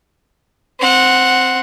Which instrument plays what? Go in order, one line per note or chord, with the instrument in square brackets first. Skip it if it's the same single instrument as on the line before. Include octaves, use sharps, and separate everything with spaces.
[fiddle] C4 F#5